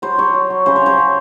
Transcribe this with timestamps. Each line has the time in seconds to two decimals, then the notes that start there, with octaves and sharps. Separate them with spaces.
0.02 F#3 C5
0.18 F#3 C#5
0.34 F#3
0.50 F#3
0.66 C#3 C5
0.76 C#5
0.82 C#3 C5
0.98 F#3